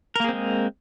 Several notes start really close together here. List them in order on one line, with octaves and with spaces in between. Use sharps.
A#4 A#3 G#4 C4 G#3